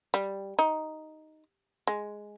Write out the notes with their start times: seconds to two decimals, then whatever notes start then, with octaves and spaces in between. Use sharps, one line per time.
0.14 G3
0.59 D#4
1.87 G#3